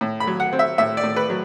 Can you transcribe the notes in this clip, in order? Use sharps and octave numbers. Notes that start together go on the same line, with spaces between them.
A2
B5
F#3
F#5
C4
E5
A2 E5
D5
A2
B4
F#3